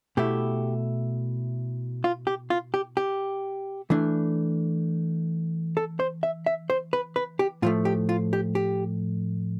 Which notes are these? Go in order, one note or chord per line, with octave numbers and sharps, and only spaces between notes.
B2 A3 E4 G4
F4
G4
F4
G4
G4
E3 A3 D4
A4
C5
E5
E5
C5
B4
B4
G4
A2 F3 A3 F4
G4
F4
G4
G4